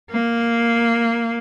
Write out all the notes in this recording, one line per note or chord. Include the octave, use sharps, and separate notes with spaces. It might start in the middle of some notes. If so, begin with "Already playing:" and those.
A#3